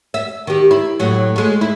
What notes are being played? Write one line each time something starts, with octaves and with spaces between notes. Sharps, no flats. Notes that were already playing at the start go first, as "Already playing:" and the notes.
E5
D#3 G4
E4
A2 F#3
G#3 A3
E4